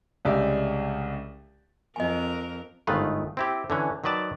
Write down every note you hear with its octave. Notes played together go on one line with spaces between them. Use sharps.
C2 C#3 G#3 G4 D5 E5
F2 A#4 D#5 G#5
G1 G#2 D#3 A3 F4 B4
C4 E4 G4
D3 E3 C#4
D#3 F#3 B4 D5 A5